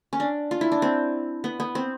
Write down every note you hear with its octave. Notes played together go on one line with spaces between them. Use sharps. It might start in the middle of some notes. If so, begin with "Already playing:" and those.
C#4
D4
F4
E4
D4
C4
B3
B3
C4